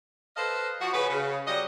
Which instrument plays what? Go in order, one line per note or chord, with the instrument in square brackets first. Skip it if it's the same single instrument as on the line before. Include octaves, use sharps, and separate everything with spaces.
[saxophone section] A4 B4 C5 D#5 F5
F3 F#4
C#3 G#4 B4
C#3
F#3 G3 D#5